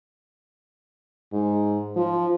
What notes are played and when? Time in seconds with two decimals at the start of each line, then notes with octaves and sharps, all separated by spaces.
1.33 G#2
1.96 F3